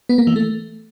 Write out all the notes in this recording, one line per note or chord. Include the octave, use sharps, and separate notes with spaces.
B3
A#3
E3
A3